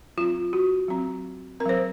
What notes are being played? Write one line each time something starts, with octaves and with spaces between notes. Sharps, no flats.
F#3 C4 F4
F#4
F#3 C4
C4 A#4
F#3 C5